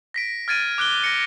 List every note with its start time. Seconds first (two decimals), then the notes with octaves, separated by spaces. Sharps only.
0.14 A#6 B6 D7
0.48 F6 G#6 A6 D7 D#7
0.78 D6 F#6 D7 G7
1.04 A#6 C#7